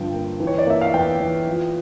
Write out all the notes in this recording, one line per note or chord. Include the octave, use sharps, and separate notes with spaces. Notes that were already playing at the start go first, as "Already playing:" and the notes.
Already playing: G2 D3 F3 G5
A#3
E3
C#5
D5
A#3 E5
F5
E2 G5
E2
F3